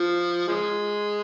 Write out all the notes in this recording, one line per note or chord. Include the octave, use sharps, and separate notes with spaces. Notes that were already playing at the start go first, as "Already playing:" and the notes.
Already playing: F3
F3 G#3